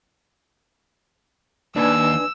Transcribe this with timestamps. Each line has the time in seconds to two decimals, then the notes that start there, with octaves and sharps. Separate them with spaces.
1.76 D#2 D4 B4 G#5 E6